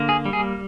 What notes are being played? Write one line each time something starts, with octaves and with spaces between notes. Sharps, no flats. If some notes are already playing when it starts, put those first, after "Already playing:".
Already playing: D3 A#3
G#4
G3
G#4